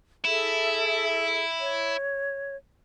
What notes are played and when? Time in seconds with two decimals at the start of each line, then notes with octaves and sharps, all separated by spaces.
0.25 E4 G#4 A4 E5
1.59 C#5